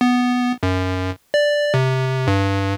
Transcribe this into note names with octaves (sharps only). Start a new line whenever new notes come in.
B3
F#2
D5
C3
G2